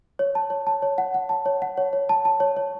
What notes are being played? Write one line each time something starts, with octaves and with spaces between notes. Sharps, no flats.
C#5
A5
C#5
A5
C#5
F#5
F#5
A5
C#5
F#5
C#5
C#5
A5
A5
C#5
C#5